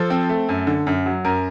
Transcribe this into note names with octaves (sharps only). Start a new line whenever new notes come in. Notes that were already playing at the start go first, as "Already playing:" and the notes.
Already playing: F3 A4
C4
A3
F#2
D3
F#2
F#3
F#2 A#4